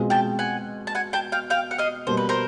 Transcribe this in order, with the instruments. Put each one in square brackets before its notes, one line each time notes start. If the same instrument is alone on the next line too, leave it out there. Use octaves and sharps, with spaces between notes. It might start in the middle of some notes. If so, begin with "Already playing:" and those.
Already playing: [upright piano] B2 G#3 C4 F4 G#4
[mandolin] G5 A5
F#5 G#5
A5
F#5 G#5
G5 A5
F5 G5
F5 G5
F#5
D#5 F5
[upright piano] B2 G3 A#3 [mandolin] C5
[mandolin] B4
A#4 C5